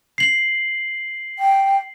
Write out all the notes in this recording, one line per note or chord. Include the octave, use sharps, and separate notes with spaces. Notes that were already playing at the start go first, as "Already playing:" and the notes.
C7 F#7
G5